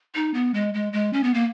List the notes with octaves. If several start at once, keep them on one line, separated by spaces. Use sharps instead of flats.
D#4
B3
G#3
G#3
G#3
C#4
B3
A#3